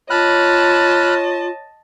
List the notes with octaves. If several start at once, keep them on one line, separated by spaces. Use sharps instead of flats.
F4 C#5 D#5 A5 B5 F6 F#6